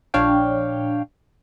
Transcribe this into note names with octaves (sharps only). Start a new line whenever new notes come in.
A#1 D4 C#5 F5 G5